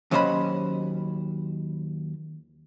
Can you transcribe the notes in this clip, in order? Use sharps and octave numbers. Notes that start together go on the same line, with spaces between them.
D#2 F#3 C#4 C5 D#5 B5